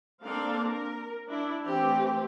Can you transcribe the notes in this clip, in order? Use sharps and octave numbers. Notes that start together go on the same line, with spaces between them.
A#3 C4 D4 A4 F5
A#4
D4 E4
E3 A3 C4 G4